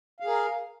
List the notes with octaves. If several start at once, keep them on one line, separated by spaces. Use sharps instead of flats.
G#4 A#4 F5